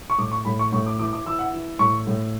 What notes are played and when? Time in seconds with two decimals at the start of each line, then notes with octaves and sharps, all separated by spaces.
0.10 C#6
0.18 A2 D6
0.32 C#6
0.45 A2 B5
0.59 C#6
0.72 A2 C#6
0.86 D6
0.99 E3 D6
1.13 D6
1.26 E3 E6
1.39 F#5
1.54 E3
1.79 A2 C#6
2.07 A2